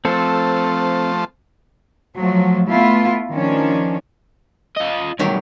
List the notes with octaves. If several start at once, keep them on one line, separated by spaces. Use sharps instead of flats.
F3 A3 C4 A4 C5
F3 F#3 A3
A3 B3 E4 F4
D#3 F3 C#4 D4
F4 D#5
B1 G2 D#3 F#3 G4